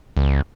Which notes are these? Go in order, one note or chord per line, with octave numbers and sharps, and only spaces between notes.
C#2